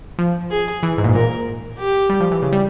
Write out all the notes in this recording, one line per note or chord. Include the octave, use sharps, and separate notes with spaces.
F3
G#4
E3
G#2
A#2
G#2
A#2 A#4
G4
G3
F3
E3
C#3
G3